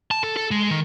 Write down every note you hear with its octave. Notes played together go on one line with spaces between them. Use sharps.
A5
A4
A4
G#3
D#3